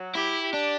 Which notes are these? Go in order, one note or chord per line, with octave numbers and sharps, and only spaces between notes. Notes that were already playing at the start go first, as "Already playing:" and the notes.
Already playing: F#3
E4 G4
G4
D4